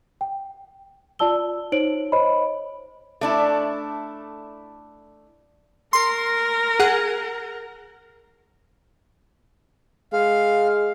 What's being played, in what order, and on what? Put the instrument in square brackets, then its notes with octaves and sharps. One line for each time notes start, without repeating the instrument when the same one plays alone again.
[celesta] G5
F4 D5 A5 E6 G7
D#4 C5 C#5 D7 F#7
C5 C#5 D#5 B5
[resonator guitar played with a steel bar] A3 D4 E4
[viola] A#4 [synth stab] C6
[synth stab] G#4 F#5
[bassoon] G#3 [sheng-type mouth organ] F5